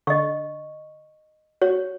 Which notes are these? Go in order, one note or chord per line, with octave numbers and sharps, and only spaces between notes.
D3 D#5 C#6
F#4 C#5